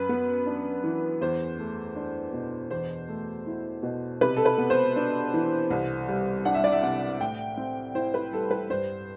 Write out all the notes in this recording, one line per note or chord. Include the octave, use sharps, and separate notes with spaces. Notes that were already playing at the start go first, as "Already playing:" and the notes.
Already playing: F#2 B4
B3
D4
E3
E2 C5
A3
D4
B2
E2 C5
A3
E4
B2
C3 B4
A4
B4
B3
C5
D4
E3
C2
G3
D4 F#5
E5
D5
E5
C3 F#5
A2 G5
C4
E4 C5
B4
G3 A4
B4
G2 C5